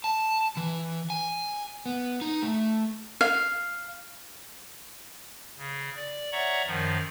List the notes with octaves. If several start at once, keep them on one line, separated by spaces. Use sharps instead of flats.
A5
E3
G#5
B3
D#4
A3
F5
C#3
D5
C#5 D5 E5 F#5 A#5 C#6
F#2 D#3 F3